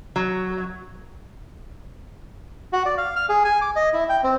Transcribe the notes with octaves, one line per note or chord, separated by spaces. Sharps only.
F#3
F#4
D5
F5
F6
G#4
G#5
D6
D#5
E4
G5
C4